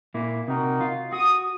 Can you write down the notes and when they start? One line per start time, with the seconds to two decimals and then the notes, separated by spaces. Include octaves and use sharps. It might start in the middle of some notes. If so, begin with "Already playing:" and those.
0.14 A#2 A#3 E4
0.48 C3 D#4 F#4 A#4
0.81 F4
1.12 F#4 D#6